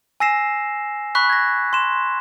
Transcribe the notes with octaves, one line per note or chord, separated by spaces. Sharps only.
G#5 E6 A#6 C7 E7
B5 C#6 F#6 B6
G#6 A#6
C6 E7